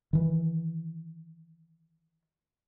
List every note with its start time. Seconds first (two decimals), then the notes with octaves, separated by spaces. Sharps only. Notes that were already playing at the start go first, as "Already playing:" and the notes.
0.13 D#3 E3